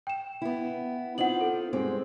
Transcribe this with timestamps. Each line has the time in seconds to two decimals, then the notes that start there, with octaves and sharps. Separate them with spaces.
0.07 G5 E7
0.42 B3 E4
1.18 C4 D#4 F4 F#5 F#7
1.41 A4
1.73 G2 G#3 C4